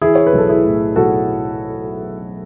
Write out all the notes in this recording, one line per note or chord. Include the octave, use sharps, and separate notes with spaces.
E3 E4 G#4
C#5
B4
B1 A4
E4 G#4
A2
B1 F#4 A4